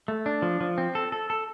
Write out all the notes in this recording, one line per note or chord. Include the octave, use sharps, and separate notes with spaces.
A3
D4
F3
F3
C4
A4
A4
A4